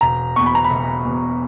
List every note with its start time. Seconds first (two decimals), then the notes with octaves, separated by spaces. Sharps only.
0.01 E1 A#5
0.36 E2 B2 C#6
0.46 B5
0.55 A#5
0.64 B5
0.70 E1
1.05 E2 B2